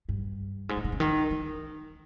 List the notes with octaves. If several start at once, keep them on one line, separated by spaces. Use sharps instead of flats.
G2
G#2
A#2
C3
C#3
D#3
D#3